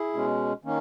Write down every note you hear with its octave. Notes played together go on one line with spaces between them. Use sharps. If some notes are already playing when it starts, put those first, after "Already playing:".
Already playing: E4 G#4
B2 G#3 C#4
D#3 A#3 C#4